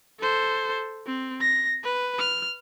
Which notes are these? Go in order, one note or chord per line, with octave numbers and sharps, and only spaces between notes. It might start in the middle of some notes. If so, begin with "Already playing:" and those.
A4 C5
C4
A#6
B4
F6